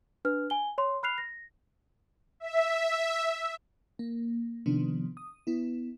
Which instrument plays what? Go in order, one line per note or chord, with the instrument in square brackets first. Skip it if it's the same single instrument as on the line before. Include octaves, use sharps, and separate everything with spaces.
[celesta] D4 B4 F6
G#5 G7
C#5 C6
B5 F6 F#6 C7 F7
A#6
[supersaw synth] E5
[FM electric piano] A#3
C3 D#3 F3 B3 D4
D#6
B3 E4